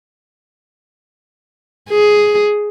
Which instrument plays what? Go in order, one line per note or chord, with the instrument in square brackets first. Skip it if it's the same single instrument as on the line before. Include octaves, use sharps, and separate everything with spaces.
[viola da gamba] G#4